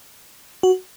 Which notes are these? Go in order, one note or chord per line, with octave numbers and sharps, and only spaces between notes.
F#4